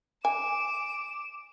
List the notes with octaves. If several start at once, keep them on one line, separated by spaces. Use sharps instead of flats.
G#5 D6 E7